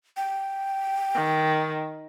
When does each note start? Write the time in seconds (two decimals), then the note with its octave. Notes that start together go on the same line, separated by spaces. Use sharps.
0.17 G5
1.14 D#3